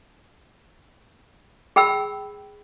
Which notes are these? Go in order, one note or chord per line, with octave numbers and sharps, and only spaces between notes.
G#4 G5 B5 E6